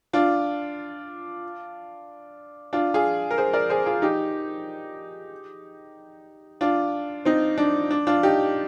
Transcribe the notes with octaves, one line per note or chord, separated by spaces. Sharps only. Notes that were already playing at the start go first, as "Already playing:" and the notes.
D4 F4
D4 F4
F4 G#4
A#4
G#4 C5
A#4 D5
G#4 C5
F4 G#4
D#4 G4
D4 F4
C4 D#4
D4
D4
D4 F4
D#4 G4